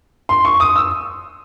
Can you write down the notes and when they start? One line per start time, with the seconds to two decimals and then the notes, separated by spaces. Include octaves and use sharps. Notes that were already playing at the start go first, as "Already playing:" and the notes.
0.29 C6
0.45 C#6
0.60 D#6
0.76 E6